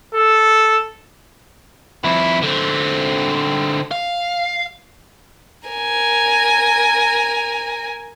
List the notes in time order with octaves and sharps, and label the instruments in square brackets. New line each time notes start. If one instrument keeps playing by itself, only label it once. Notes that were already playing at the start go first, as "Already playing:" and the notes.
[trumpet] A4
[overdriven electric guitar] F2 E4
D3 C4
F5
[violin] A#4 G#5